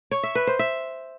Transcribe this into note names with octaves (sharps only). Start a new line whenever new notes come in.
C#5
E5
B4
C5
E5